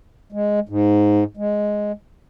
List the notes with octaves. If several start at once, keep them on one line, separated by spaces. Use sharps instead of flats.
G#3
G#2
G#3